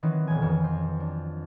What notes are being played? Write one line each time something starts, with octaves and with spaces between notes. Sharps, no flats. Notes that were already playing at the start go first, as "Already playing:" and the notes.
D#3 E3 F#3 C4 D#4
D#1 B1 G#5
F2
C5
D4